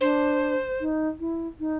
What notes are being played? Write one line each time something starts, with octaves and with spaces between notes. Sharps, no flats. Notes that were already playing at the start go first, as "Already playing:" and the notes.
D4 C5
D#4
E4
D#4